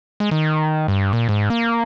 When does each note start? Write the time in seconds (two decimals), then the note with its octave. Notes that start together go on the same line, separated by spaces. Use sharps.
0.20 G#3
0.31 D#3
0.88 G2
1.13 A#2
1.29 G#2
1.50 A#3